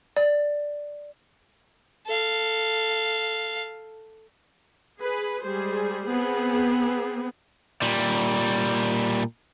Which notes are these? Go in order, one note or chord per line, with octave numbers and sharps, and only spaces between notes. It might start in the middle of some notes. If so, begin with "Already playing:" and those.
D5
A4 F5
G#4 B4
G3 G#3 G#4 C5
B3 C4 G#4
A#2 G3